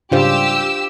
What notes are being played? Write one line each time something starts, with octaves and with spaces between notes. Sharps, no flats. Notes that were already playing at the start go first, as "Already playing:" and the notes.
G#2 C#3 G3 D4 F4 G4 C5 E6